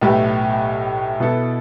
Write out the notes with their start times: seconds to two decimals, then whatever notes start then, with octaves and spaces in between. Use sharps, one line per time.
0.01 B1 A2 A3 G4 B4
1.20 B2 B3 E4 A4